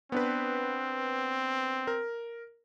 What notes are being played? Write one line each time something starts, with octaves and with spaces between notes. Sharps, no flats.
B3 C4 D4 B4
A#4